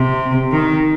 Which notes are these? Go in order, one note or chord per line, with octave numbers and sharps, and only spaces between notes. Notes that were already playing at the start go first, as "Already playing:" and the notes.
Already playing: C3
D#3